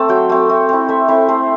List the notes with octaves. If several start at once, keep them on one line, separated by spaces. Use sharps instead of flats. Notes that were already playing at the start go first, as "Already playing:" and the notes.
Already playing: A3 C4 A5
F#3 G5
A3 C4
A3
C4 E4
A3 E5
C4 E4 E5
A3 C5